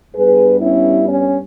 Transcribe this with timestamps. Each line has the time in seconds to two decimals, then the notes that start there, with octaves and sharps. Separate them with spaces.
0.15 G2 G3 B3 G#4 B4
0.61 C#4 E4
1.09 C#4